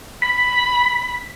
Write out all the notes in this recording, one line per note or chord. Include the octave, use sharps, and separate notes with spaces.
B5 B6